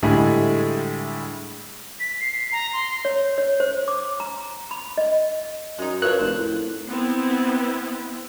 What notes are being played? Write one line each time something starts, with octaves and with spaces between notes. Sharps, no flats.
A2 D3 G3 G#3 E4 G#4
B6
C7
A#5
C6
C#5
C#5
C5
D6
A#5
B5
D#5
F#2 G#3 D#4
D4 F4 A#4 B4 C#5 F#6
F1 C5
A2
B3 C4 E4